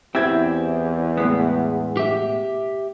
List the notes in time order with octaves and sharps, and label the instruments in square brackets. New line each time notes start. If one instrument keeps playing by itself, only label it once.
[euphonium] E2 [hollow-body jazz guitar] C4 G4 [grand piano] E4 G#6
[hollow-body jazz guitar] A2 G#3 B3
[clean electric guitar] G4 E5